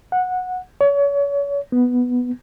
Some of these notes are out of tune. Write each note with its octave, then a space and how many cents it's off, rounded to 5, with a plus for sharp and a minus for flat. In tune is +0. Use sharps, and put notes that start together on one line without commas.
F#5 -15
C#5 +35
B3 +0